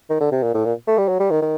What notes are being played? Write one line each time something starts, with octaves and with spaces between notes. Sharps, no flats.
D#3
D3
C3
A#2
A2
A#2
A3
G3
F#3
G3
D#3
D#3